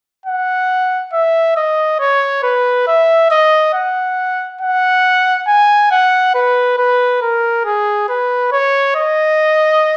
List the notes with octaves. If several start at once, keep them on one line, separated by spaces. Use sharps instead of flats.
F#5
E5
D#5
C#5
B4
E5
D#5
F#5
F#5
G#5
F#5
B4
B4
A#4
G#4
B4
C#5
D#5